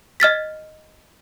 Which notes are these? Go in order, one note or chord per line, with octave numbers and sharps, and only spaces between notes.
D#5 F6 A6 B6